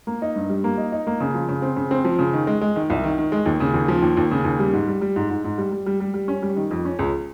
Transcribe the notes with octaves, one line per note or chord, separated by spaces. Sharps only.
A#3
D#4
G2
G3
A#3
D#4
D#4
A#3
C#3
F3
C#3
C4
C#3
C4
F3
C#3
D#3
G#3
G#3
D#3
C2
D#3
D#3
G#3
D#2
C#3
D#2
F3
D#2
D#2
C#3
D#2
G3
G#2
G3
G3
G#2
G#2
G#2
G3
G3
G3
G3
G3
C#4
G3
D#3
F2
C#4
C#2